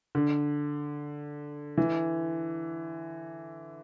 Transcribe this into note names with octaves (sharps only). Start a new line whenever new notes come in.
D3
E3